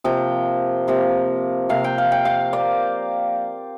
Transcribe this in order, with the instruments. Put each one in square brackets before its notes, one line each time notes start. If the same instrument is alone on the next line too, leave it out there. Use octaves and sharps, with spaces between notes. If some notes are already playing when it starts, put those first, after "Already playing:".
[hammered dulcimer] C3 F3 A#3 G5
C3 F3 A#3
C3 A#3 F5
G5
F5
G5
F5
A#3 D5